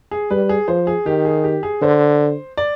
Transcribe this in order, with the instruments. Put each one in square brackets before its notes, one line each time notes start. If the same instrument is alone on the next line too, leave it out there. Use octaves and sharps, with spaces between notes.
[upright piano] G#4
[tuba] G3 [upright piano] B4
[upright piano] G#4
[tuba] F3 [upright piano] C5
[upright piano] G#4
[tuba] D#3 [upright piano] G4
[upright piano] G#4
G4
G#4
[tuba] D3 [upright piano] C5
[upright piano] D5